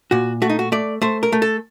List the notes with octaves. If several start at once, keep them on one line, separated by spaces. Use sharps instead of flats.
A#2 F#4
A3 F#4
D#4
F#4
A3 D5
A3 C5
A#4
A3
A4